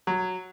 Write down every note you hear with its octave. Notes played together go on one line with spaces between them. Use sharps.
F#3